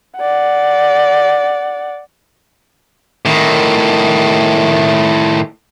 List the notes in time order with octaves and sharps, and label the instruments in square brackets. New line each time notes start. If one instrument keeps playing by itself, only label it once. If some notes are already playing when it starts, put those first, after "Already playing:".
[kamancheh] D5 F#5
[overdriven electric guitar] A2 D#3